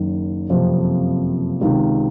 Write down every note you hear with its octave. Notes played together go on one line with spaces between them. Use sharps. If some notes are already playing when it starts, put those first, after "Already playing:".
Already playing: F#1 F#2 D#3
F#1 F2 C3 F3
C#2 C3 D#3